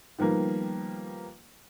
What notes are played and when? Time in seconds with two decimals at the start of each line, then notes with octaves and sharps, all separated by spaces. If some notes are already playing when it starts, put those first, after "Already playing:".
0.18 D#3 F3 G3 A#3 B3